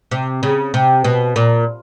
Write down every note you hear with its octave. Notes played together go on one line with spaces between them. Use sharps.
C3
C#3
C3
B2
A#2